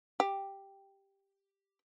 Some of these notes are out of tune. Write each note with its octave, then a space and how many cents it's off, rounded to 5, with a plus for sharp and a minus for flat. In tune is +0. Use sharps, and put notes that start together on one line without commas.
G4 +0